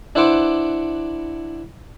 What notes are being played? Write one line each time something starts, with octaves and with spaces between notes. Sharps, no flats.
D4 E4 B4 C5 F#5 D6